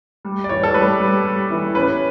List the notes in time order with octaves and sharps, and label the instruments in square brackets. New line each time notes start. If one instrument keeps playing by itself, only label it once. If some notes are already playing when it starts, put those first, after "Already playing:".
[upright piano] G3
[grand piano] D5
[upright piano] E3 [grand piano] C#5
[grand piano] A4
[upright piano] G3 [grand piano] B4
[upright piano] G3
G3
E3
[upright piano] C#4 [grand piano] B4